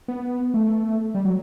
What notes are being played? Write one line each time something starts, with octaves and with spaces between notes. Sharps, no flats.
B3
A3
G3
F#3